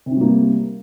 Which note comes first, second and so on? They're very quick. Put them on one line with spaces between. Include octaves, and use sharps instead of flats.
C3 C#4 G3 A#3